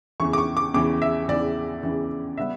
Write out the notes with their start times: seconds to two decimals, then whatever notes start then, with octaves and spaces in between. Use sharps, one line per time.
0.20 E2 C#3 E3 C#6
0.33 D6
0.38 C#6
0.57 D6
0.74 E2 C#3 E3 D6
1.02 E5
1.28 E2 C#3 E3 D5
1.83 E2 C#3 E3
2.38 C#3 G3 B3 E5